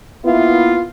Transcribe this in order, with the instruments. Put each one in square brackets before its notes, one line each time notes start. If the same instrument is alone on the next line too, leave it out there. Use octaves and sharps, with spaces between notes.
[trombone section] A#3 B3 E4 [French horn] F4